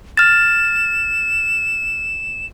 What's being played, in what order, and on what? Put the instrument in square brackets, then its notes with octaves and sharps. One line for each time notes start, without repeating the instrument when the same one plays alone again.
[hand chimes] F6 A6 [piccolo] E7